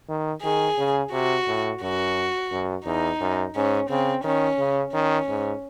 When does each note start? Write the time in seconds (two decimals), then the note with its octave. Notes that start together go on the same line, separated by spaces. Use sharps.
0.09 D#3
0.43 D#3 G#4
0.78 C#3
1.12 C3 F#4
1.47 A2
1.82 F#2 F#4
2.51 F#2
2.85 E2 D#4
3.20 F#2
3.55 G#2 C#4
3.90 C#3 C4
4.24 D#3 C#4
4.59 C#3
4.93 D#3 C#4
5.28 G#2